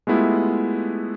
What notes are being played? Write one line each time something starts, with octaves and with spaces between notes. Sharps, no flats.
G#3 A3 B3 E4 F4 G4